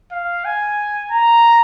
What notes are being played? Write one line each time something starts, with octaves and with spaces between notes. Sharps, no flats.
F5
G#5
A#5